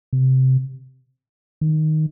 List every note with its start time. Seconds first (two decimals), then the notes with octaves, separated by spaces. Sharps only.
0.13 C3
1.61 D#3